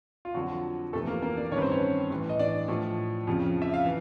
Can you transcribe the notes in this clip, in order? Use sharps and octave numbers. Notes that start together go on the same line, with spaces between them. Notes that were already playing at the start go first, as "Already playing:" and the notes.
F4
F2 D3 F3 F#3 F#4
F2 C3 E3 A3 A4
A#3 A#4
A#3 A#4
D4 D5
G2 D#3 C#4 B4 C#5
C4 C5
C#4 C#5
A2 E3
D#5
D4 D5
A2 F3
F2 C#3 F3
E5
F5
E3